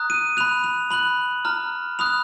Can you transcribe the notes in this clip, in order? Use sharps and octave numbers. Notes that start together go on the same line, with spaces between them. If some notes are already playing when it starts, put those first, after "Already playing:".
Already playing: A#5 D#6 F#6
D#7
B5 F#6 F7
F7
B5 F#6 F#7
A#5 F6
B5 D#6 F#6 F7